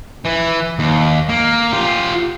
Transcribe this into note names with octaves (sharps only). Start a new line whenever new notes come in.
E3
D#2
A#3
F4 G4